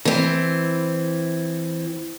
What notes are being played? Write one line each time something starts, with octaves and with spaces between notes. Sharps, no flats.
E3 C4